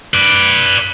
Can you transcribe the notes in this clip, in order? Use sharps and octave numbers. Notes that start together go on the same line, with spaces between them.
B4 D5